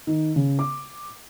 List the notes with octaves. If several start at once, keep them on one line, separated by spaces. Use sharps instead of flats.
D#3
C#3
D6